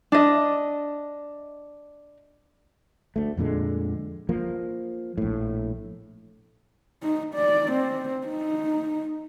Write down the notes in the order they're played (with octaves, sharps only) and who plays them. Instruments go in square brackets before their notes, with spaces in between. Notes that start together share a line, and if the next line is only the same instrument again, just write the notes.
[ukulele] D4 D#5
[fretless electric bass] D2 A3
F2 A#2 D3 G#3
F3 A#3
A#1 A2
[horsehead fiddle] D#4
D5
C4
D#4